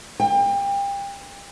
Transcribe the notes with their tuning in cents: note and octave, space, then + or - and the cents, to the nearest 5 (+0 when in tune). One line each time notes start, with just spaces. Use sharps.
G5 +30